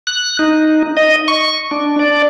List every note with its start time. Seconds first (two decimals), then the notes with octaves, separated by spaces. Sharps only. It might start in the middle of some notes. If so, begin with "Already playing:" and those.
0.07 F#6
0.39 D#4
0.97 D#5
1.28 C#6
1.71 D4
1.99 D5